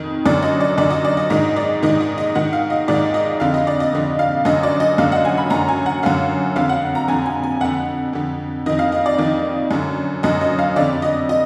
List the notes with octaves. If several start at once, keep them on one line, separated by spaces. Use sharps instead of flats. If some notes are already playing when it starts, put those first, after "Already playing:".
Already playing: F2 D#3
F#2 D3 D5
D#5
D5
F#2 D3 D5
D#5
D5
D#5
G#2 D#3 D#5
D5
G#2 D#3 D#5
D#5
D#5
G#2 D#3 F#5
F5
D#5
G#2 D#3 D5
D#5
F2 D3 F5
D#5
D5
D#5
F2 D3
F5
F#2 D3 D#5
D5
D#5
F#2 D3 F5
F#5
G#5
B5
F#2 D3 A#5
G#5
F#5
F#2 D3 F5
F2 D3 F5
F#5
A#5
F2 D3 G#5
G#5
G#5
F2 D3 F#5
F2 D3
F2 D#3 D#5
F5
D#5
D5
F2 D#3
F#2 D3
F#2 D3 D#5
D#5
F5
F2 D3 D5
D#5
D#5